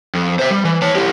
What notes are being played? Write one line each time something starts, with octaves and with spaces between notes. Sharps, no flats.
F2
C5 E5
G3
E3
C#5 A5
E4 G4